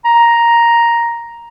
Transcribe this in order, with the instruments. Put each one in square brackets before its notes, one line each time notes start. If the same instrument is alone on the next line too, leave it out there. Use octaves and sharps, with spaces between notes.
[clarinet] A#5